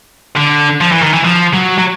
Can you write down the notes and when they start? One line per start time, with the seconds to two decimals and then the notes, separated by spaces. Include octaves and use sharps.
0.37 D3
0.81 F3
0.91 E3
1.02 D#3
1.13 E3
1.24 F3
1.54 F#3
1.78 F#3